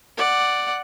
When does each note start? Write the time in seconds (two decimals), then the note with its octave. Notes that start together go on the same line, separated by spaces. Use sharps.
0.17 D5 F#5